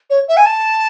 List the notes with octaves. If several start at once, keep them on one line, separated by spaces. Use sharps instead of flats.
C#5
E5
G#5
A5